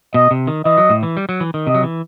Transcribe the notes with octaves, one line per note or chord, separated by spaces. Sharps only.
B2 D#5
C3
D#3
E3 D#5
F#3
A2
E3
G3
F#3
E3
D#3
C3 D#5
F#3
E3